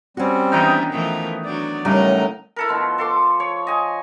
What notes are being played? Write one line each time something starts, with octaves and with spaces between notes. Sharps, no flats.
G3 C4 C#4 F#4
D#3 E3 B3 D4 D#4
E3 F3 A3 A#4
F#3 D4 D5
A2 C#3 F#3 G3 D#4 A#4
E4 A4 A#4
B2 F3
A4 C6 D6
C#5
D#5 G#5